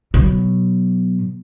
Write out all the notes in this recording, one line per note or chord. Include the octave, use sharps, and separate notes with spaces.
B2 F#3